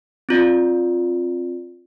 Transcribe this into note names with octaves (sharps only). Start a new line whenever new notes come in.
C4 F4 D5